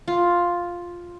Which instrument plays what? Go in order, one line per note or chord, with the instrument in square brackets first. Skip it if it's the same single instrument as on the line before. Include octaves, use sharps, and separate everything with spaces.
[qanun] F4